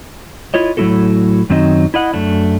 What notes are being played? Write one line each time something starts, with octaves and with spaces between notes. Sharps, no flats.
E4 F4 C#5 D#5
A2 F#3 A3 E4 F#4 A4
F#2 D#3 F#3 C4 D#4 D#5
E4 D#5 F#5
F#2 A3 D4